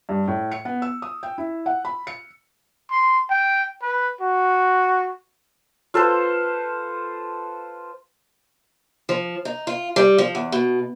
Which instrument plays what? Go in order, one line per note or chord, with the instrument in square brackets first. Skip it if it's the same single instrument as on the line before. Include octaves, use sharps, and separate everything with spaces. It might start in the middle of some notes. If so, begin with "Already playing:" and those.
[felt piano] G2
A2
C#7
B3
E6
D#6
G5
E4
F#5
B5
C#7
[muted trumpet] C6
G5
B4
F#4
[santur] F4 A4 B4 C5
[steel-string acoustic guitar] F3
D#4
F4
G3
F3
E2
B2